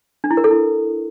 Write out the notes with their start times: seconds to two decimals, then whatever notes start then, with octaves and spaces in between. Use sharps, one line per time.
0.24 D4
0.31 E4
0.37 A#4
0.44 A4
0.51 E4